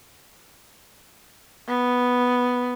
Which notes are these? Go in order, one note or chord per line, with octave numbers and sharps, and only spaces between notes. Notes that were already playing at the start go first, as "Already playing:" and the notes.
B3